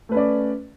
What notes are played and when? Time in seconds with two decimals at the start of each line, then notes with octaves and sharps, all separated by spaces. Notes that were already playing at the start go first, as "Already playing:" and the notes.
0.09 A3
0.12 B4
0.14 C#4
0.17 D5